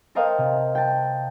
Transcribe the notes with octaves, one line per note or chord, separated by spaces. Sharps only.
A4 A#4 C5 D#5 F5 G5
C3
G5 A5